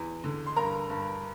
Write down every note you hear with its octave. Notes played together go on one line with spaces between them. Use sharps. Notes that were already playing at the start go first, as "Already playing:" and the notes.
Already playing: E2
D3
C6
G2 A#4 A#5
G2